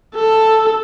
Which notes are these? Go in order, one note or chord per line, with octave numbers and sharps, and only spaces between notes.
A4